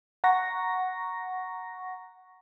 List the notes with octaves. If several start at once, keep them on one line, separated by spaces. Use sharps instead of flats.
F#5 A#5 C#6 A#6